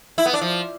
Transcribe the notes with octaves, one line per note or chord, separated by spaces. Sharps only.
E4
B3
D4
F3